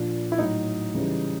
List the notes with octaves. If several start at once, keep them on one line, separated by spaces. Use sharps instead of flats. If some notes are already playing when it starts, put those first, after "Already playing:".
Already playing: A#2 F3 D4
E4
A2 F#3 D#4
C#3 E3 G3